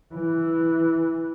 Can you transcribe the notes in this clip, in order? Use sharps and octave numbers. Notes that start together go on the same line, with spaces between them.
E3